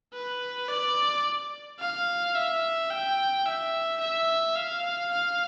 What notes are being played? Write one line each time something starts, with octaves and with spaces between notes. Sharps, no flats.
B4
D5
F5
E5
G5
E5
E5
F5
F5